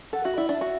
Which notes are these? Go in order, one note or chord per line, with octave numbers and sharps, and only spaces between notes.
A4 F#5
F#4 E5
E4 D5
D4 E5
F#4